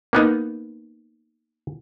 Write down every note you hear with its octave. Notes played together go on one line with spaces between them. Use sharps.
A#3 B3 D#4